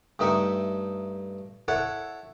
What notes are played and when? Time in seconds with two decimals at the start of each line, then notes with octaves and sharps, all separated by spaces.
0.19 G2 A3 D#4 E5 G5 C#6
1.68 E4 A4 C#5 F#5